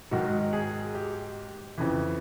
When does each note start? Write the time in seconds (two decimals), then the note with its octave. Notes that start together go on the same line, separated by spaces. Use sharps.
0.11 G#2 D#3 F#3 F#4
0.53 G#4
0.94 G4
1.78 F2 C#3 E3